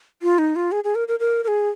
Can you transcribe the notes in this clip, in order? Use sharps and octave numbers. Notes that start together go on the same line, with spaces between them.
F4
D#4
F4
G#4
G#4
A#4
A#4
A#4
A#4
G#4